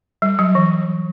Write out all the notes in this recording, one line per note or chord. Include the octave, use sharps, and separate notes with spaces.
G3
F#3
E3